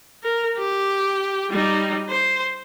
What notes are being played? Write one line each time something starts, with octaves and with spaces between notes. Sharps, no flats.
A#4
G4
G3 D#4
C5